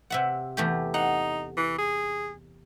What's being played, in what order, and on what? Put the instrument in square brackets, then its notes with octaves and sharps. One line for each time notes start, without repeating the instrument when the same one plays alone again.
[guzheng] C3 E5 F#5
E2 A3 G4
[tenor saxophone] D#4 [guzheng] F#5
[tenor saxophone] E3
G#4